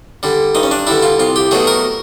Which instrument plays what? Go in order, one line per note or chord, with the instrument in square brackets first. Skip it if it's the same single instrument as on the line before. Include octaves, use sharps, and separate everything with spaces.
[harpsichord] D3 G3
G2 D#4
C#4
D4
D3 G3 E4
F4
C2 F4
G4
B2 F#3 A3 G#4
A#4